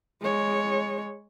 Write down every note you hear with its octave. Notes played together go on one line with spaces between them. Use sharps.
G#3 C#5